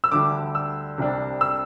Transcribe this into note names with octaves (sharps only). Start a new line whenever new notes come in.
E6
D2 D3 G3 D6
E6
C2 C3 G3 D4
E6